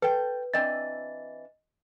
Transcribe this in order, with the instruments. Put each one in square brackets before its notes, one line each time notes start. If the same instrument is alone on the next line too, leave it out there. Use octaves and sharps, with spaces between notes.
[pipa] A4 G5 [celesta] B4
[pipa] E3 C4 D4 [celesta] D#5 A6